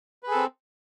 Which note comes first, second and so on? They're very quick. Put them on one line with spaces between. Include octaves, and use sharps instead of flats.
B4 G#4 A4 C4